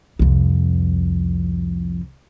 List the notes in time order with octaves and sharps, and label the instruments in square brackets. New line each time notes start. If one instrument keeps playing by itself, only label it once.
[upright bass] C2 F2